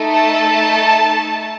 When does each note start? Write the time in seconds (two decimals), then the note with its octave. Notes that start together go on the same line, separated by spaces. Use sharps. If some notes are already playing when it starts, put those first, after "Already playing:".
Already playing: A3 D#4 A4
0.12 A5